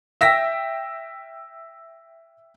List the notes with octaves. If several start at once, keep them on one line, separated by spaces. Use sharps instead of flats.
E5 G5 E6 A#6 B6